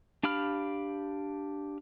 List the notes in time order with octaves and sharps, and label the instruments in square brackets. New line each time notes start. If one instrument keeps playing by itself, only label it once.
[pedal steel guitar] D4 G4 F5 B5 F6